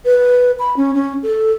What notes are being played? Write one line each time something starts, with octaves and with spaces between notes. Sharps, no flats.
B4
B5
C#4
C#4
A4